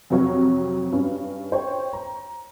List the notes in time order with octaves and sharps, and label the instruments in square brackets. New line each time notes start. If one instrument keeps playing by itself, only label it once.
[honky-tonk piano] F2 C3 F#3 C#5 F5
G2 C#4
C5 C#5 G5
A#5